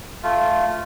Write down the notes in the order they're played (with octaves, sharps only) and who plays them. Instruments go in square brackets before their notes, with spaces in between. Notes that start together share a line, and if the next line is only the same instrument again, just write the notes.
[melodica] A3 F4